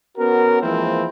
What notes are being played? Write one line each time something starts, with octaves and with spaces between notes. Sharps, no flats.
B3 C#4 F#4 A#4
E3 F3 G#3 A#3 C4 E4